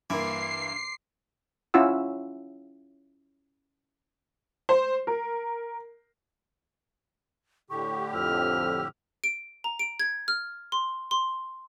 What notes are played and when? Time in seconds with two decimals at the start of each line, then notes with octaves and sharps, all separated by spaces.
0.10 G2 E3 A#3 C6 D6 C7 D7
1.74 C#4 E4 F4 F#5 E6
4.69 C5
5.07 A#4
7.70 A2 D3 G4 C#6
8.14 F2 E6 F6
9.24 D7
9.64 A#5
9.79 D7
10.00 G#6
10.28 F6
10.72 C6
11.11 C6